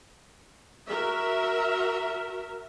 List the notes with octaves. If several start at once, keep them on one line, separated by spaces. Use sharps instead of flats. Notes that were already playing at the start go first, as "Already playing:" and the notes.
F#4 A#4 E5